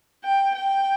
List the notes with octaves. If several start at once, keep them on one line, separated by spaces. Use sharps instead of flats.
G5
G5